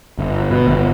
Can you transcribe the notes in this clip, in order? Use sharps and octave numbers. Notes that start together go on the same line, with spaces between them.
G1
B2
G1